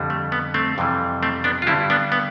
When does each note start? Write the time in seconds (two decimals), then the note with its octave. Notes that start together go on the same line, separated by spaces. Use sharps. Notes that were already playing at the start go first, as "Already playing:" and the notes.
Already playing: F2 D3 G3
0.10 A3
0.32 B3
0.54 A3 C4
0.78 F2 C3 E3 G3
1.23 A3 C4
1.44 B3 D4
1.62 F4
1.67 G2 D3 G3 C4 E4
1.90 B3 D4
2.12 B3